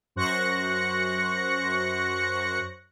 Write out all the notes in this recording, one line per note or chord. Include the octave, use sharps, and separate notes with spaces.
F#2 C5 C#6 F#6 A#6 C#7